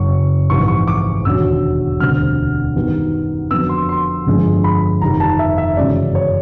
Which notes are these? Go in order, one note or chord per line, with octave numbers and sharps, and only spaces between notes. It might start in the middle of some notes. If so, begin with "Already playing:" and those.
Already playing: F#1 F#2 C#3 F#3 C#6
A#1 G#2 E3 G3 C4 C#6
C#6
D6
E1 D#2 D3 F#3 E6
E1 D2 D3 G3 C4 F6
F#2 D#3 G3 B3
F2 D3 F#3 B3 E6
C6
C6
G1 F2 D3 F3 G#3
B5
F1 F2 C3 D#3 G3 A#5
A5
E5
E5
G1 F#2 C#3 E3 G#3 D5
C#5